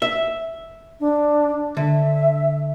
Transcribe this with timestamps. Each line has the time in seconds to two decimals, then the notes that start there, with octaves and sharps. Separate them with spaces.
0.02 E5
1.00 D4
1.77 D3 E5